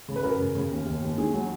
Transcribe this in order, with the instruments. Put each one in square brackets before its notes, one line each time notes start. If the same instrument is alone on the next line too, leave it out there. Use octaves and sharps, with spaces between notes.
[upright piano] C#3
B4
F#2 A#4
C#3
C#3
D#2
D#2
D#2
D#3 G#4
F#3